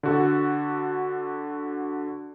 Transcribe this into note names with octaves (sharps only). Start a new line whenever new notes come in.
D3 F#4 A4